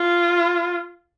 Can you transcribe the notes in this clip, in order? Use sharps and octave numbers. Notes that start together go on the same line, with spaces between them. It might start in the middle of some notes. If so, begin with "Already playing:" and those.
Already playing: F4